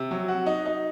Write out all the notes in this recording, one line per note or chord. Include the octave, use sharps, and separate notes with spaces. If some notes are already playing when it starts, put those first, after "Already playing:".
Already playing: C3
F#3
F#4
D#4
D#4